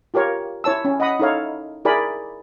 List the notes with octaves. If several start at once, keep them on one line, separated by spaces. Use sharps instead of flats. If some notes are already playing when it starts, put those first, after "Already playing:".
F4 G4 A#4 C#5 F5
E4 C#5 A5 E6
C#4
D#5 F#5 B5 D#6
D#4 E4 A4 C#5 F5
E4 G#4 A#4 D5 G#5 B5